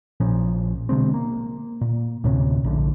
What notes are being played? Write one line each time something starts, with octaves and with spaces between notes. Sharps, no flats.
A#1 A#2 F3 C#4
B2 D3 G#3 C4
A#3
A#2
D2 A2 C3 C#4
A#1 A2 D3